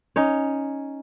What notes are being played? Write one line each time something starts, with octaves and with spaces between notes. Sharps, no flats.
C#4 D#4 C#5